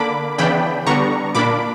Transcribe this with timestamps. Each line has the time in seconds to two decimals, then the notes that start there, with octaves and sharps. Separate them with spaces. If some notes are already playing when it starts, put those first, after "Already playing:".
Already playing: D3 A#3 D4 B5 D6
0.38 C#3 E3 B3 D4 G5 B5
0.87 D3 G3 B3 D4 A#5 C#6
1.35 A#2 A#3 D4 B5 D6